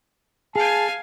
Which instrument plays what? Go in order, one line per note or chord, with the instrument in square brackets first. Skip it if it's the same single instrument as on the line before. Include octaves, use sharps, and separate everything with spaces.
[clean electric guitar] G#4 [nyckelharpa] F5 G#5 [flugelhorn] A5